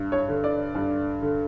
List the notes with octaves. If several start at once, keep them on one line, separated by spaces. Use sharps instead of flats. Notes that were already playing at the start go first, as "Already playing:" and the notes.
Already playing: G2
C#5
D3
D5
G2
D3